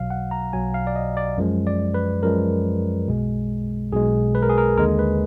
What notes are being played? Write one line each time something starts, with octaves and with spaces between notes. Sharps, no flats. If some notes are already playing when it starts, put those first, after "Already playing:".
Already playing: B1 B2 F#3 F5
F#5
A#5
B1 B2 F#3 G#5
F5
D5
D#5
D5
F#2 F3 G#3
D5
B4
F#2 F3 G#3 A#4
B1 B2 G#3
B1 B2 G#3 G#4
B4
A#4
G#4
A#4
D#2 D3 G#3 A#4
B4